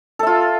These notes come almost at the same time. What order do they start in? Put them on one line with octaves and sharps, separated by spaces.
A4 E5 F4